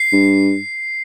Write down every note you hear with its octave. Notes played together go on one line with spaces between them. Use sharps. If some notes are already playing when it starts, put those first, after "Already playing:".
Already playing: C7
G2